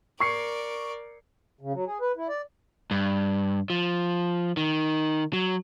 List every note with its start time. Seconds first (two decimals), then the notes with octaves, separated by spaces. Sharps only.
0.20 A#4 D5 C#6 C7 C#7
1.61 C#3
1.73 F#3
1.87 G#4
2.01 B4
2.17 E4
2.29 D5
2.91 G2
3.70 F3
4.57 D#3
5.33 F#3